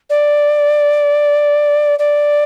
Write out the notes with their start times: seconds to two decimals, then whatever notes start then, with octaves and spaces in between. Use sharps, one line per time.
0.10 D5
1.99 D5